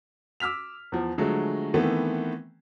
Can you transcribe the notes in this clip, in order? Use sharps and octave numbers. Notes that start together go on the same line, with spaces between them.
D6 E6 F6 B6 F7
E2 F3
D3 F3 F#3 G#3 A3
D#3 E3 A3 B3 C4